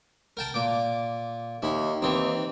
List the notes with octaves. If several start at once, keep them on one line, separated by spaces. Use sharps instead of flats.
A#4 G5 A5
A#2 D6
D#2 E4
D#2 E3 C4